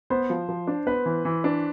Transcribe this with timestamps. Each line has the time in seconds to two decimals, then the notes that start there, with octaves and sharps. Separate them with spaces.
0.10 B3 C5
0.30 F3
0.49 F3
0.67 D4
0.87 B3 B4
1.06 E3
1.25 E3
1.44 D4